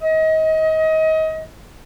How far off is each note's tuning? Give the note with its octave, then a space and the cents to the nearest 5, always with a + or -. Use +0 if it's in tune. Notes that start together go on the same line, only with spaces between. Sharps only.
D#5 +30